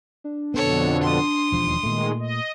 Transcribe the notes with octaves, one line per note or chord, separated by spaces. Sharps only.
D4
F2 B2 D3 B3 A4 C#5
C6 D#6
E1 D#2 F3
A#2 D#3 G#3 A3
D#5